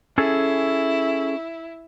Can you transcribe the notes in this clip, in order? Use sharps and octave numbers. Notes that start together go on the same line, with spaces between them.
C#4 E4 G#4 A4